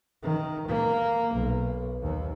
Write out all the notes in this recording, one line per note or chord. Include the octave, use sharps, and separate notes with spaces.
D#3
A#3
B1
D#2